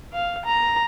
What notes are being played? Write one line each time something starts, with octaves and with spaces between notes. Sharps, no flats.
F5
A#5